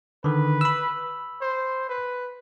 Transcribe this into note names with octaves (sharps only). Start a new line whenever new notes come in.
D3 D#3 B4
B5 E6
C5
B4